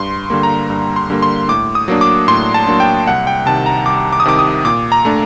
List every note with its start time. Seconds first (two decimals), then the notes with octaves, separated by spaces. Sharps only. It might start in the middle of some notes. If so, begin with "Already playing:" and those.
Already playing: G2 C6
0.30 D3 G3 A#3
0.43 A#5
0.70 G2
0.96 C6
1.10 D3 G3 A#3
1.22 C6
1.48 A2 D6
1.75 D#6
1.88 F#3 A#3 D4
2.01 D6
2.28 A2 C6
2.54 A5
2.67 F#3 A#3 D4
2.80 G5
3.07 C2 F#5
3.27 G5
3.46 C3 D#3 A5
3.66 A#5
3.85 C2 D6
4.13 D6
4.20 D#6
4.25 C3 D#3 D6
4.39 D#6
4.65 A#2 D6
4.92 A#5
5.05 A3 D4